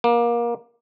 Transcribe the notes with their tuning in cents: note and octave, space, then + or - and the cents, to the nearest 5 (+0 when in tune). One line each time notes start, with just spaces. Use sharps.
A#3 +25